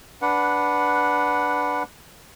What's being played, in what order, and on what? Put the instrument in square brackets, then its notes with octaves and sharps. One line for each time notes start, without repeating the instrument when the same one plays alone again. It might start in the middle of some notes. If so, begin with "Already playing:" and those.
[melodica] D4 B4 F#5